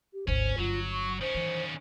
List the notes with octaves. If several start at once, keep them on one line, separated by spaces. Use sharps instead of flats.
G4
G#1 D2 C#4 C5
G1 F#3 F4
C#6
D#3 C#4 C5
E3